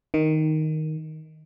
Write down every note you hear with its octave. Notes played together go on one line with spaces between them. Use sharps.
D#3